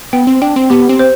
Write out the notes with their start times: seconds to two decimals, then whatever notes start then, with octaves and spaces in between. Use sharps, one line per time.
0.13 B3 G5
0.27 C4
0.42 D4 G5
0.56 C4
0.70 B3 G4
0.89 C4
0.99 C5